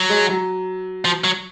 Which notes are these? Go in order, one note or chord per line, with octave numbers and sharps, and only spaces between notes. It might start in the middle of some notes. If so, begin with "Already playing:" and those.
Already playing: F#3
G#3
F#3
F3
F#3